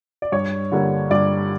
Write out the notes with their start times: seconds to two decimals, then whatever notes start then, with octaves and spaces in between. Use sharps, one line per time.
0.22 D5
0.32 G2 C#5
0.72 D3 G3 A#3 D4
1.11 G2 D5